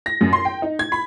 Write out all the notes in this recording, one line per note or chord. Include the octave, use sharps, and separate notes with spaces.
A#6
F#2
C6
G5
D#4
G#6
B5